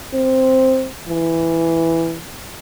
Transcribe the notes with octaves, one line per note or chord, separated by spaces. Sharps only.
C4
E3